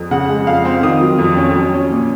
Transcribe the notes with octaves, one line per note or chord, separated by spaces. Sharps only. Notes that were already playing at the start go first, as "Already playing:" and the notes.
Already playing: F2
C#3 F#5
G#3
F2 F5
C4
D#3 D#6
F#3
F2
C#4
F#3
C#4
A#2